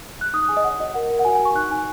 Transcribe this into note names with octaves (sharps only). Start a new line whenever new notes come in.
F#6
D#4 D#6
G#4 G#5
D#5
C#5 F#5
F#4 D#5
A#4 F#5
A#4
F#5
F#4 G#5
G#5
F#4 C#6
D#4 F#6
D#4 G#5